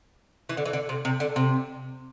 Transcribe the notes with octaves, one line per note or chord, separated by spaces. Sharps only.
E3
D3
E3
D3
C3
C3
D3
C3